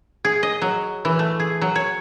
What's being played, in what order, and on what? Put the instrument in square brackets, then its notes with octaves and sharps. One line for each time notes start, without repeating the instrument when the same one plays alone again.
[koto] G#4
D#5
F#3
E3
A3
G#4
F#3
C#5